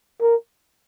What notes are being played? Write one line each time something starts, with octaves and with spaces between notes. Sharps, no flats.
A#4